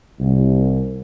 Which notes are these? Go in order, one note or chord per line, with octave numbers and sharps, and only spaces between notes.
C2